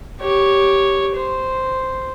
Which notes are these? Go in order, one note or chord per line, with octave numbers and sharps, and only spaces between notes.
G4 C#5
C5